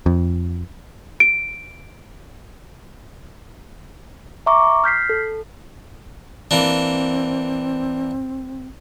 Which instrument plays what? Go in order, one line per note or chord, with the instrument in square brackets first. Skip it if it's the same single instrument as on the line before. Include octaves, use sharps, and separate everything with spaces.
[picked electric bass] F2
[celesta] D7
[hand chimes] E5 A#5 C#6 D6
F6 G6 B6 C7
A4
[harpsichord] E3 A#3 D4 [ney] C4